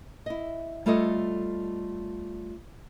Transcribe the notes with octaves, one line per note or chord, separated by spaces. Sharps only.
E4 D#5
G3 A3 F4 A4 C#5 D#5